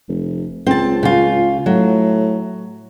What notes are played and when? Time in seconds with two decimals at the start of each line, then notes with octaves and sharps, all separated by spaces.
0.08 F1
0.66 C#2 C4 A5
1.03 C#3 F4
1.66 A2 F#3